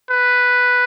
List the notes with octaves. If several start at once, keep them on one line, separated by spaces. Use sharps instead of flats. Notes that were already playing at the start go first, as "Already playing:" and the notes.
B4